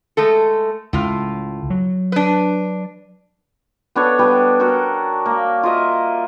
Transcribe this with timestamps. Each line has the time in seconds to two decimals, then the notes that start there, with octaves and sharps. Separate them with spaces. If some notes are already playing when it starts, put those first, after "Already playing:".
0.17 G#3 A3 A4
0.93 C#2 A2 F4
1.70 F#3
2.12 D4 B4
3.95 B3 D4 A4 C#5
4.19 G3 B3 G4
4.60 F#4 A4 A#4 G5
5.26 A#3
5.63 F4 A#4 D#5 E5